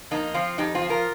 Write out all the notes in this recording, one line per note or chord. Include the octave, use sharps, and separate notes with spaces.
F2 A#3 D#4
F3 C4 F4
F2 D#4 G4
C4 F4
F3
F4 A#4